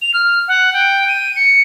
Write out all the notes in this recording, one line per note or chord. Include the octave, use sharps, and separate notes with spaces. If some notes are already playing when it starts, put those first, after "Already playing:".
F7
F6
F#5
G5
D#7
C#7